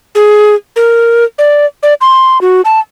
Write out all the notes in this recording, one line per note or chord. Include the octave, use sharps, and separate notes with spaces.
G#4
A#4
D5
D5
C6
F#4
A5